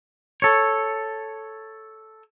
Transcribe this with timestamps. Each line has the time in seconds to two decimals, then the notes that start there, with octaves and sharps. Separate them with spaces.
0.42 A4 C#5